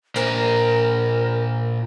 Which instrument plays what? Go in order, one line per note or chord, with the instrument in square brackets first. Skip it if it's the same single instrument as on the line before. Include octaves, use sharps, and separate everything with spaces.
[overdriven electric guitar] A#2 C5 [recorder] A#4